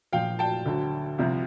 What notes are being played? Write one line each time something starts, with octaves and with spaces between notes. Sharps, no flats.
A#1 A#2 F3 F5 G5
G5 A5
D2 D3 F#3
C2 C3 F3